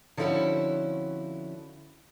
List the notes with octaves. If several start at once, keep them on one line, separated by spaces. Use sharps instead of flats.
D3 F3 C4 C#4 E4 F#4